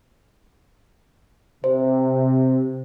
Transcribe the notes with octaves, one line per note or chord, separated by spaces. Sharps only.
C3 C5